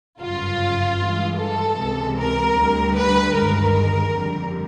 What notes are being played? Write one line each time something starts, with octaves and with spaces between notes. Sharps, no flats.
G1 F#2 C#3 F4
G2 E3 G#3
A4
C#2 C3 E3 G#3
A#4
D2 D3 G3
B4
G1 G2 D#3 G#3 A#4
F2 D3 G3